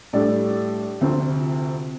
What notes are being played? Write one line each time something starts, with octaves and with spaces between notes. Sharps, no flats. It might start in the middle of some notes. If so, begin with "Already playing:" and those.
A2 G3 D4 A4 D5
D2 C3 F3 C4